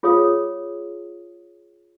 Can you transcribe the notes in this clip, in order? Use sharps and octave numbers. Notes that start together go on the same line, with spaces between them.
F4 G#4 C#5 F5 D#6